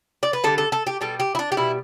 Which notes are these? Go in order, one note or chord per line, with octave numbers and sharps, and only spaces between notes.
D5
B4
D3 G3 A4
A4
A4
G4
B2 G3 A4
G4
E4
D4
G4
B2 G3 E4